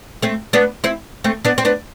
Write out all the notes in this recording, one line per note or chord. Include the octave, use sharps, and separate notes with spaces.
A3 C4
B3 D4
C4 E4
A3 C4
B3 D4
C4
B3 D4